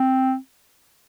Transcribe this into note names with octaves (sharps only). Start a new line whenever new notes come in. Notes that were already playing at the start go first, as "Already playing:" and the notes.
Already playing: C4